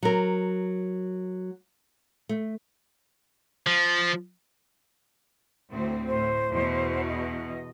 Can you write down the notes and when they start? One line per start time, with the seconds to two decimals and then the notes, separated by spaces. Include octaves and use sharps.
0.03 F#3 A#4
2.29 A3
3.67 F3
5.71 D2 A2 C4
6.08 A2 C5
6.51 E2 B2
7.07 D#5